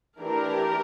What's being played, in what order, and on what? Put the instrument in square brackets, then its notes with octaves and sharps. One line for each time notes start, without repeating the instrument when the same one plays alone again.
[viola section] E3 A3 D4 G4 A#4